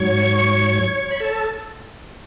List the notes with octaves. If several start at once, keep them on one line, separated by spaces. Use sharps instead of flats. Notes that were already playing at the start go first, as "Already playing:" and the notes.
Already playing: G#2 F#3 C#5 C#6
B5
A4 A5